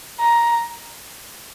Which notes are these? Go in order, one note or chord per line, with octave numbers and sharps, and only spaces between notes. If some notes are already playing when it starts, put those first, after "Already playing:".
A#5